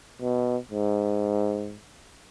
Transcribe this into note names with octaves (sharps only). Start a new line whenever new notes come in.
B2
G#2